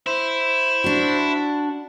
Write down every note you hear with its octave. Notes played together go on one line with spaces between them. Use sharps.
E4 C5
D4 F#4